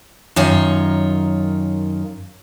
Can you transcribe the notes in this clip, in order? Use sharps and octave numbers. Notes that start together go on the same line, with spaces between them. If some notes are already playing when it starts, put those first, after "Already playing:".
F#2 D#3 F4 C#5